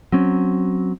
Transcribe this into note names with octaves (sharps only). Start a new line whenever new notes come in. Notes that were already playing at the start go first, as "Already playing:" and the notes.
F#3 C4 C#4